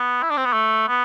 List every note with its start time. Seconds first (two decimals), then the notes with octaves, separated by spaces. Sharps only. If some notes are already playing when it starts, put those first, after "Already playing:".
Already playing: B3
0.23 E4
0.30 D4
0.37 C4
0.45 B3
0.53 A3
0.88 B3